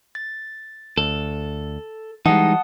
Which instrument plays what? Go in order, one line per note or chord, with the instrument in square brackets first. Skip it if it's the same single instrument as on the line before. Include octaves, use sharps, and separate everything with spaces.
[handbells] A6
[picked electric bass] D2 [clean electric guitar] A4
[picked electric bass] E3 G3 [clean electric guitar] G#3 D#4 [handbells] F#5 A5 D#6